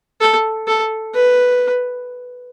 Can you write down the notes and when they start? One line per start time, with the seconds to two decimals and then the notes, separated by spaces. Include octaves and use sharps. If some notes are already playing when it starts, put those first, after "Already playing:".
0.21 A4
0.67 A4
1.14 B4